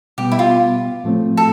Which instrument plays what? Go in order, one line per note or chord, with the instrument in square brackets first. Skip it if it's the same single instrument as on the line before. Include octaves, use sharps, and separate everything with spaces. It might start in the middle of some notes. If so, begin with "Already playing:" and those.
[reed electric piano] B2 G3 B3 [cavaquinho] G4
[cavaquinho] E4
F4
[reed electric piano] A2 F3 A3 C4
[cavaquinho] A4